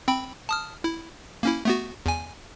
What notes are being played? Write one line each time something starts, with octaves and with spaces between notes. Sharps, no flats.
C4 G5 B5
A5 D#6 F6
E4
A#3 C#4 E4
A3 B3 F#4
E2 G#5